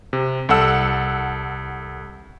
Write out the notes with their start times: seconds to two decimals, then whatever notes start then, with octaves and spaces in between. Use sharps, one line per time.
0.13 C3
0.49 C2 A4 F#5 E6